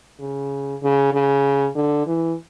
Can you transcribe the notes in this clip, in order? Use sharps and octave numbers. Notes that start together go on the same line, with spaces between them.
C#3
C#3
C#3
D3
E3